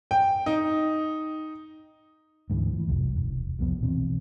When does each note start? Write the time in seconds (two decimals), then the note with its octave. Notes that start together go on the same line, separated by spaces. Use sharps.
0.11 G5
0.46 D#4
2.50 D2 G#2 E3
2.73 E3 F#3
2.88 F1 C2 F#2
3.16 E1
3.59 C2 F2 F3 B3
3.81 A#1 B2 E3 C4